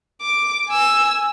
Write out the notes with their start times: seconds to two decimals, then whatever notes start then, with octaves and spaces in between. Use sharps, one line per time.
0.21 D6
0.68 G#5 E6